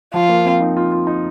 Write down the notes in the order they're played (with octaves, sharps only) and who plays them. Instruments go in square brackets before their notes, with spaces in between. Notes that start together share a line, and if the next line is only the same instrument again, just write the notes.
[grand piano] F3 [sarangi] F4
[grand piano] A#3
C4
D#4
F4
F4
D#4